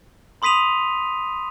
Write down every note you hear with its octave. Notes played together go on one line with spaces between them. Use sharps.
B5 C6 D#6 B6 D#7 F7